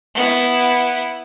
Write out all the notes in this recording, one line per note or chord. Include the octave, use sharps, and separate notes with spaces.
B3 E4